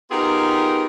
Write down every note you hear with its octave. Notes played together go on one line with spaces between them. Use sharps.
B3 D#4 F4 G4 G#4 A#4